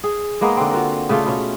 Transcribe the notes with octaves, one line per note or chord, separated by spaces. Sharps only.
G#4
G#3 A#3 B3 D#4
D3 C4
F4 F#4 A#4
C#3 A3 D4 F4
B2 C#4